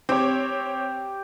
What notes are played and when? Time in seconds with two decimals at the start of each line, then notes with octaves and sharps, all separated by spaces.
0.09 C4 G4 C#5